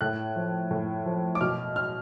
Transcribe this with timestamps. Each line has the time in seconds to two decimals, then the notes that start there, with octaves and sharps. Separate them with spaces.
0.01 A2 F#6
0.36 F3
0.71 A2
1.06 F3
1.35 D6
1.41 B2 F6
1.76 F6